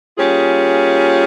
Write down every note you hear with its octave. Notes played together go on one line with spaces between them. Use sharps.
G3 A#3 C#4 F4 G#4